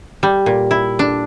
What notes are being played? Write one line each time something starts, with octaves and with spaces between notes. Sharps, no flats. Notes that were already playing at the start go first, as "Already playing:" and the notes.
G3
A#2
E4
D4